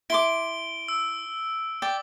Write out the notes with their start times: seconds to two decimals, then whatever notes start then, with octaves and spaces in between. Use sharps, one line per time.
0.10 E4 C6 D6 D7 G7
0.88 E6
1.82 D5 G5 D6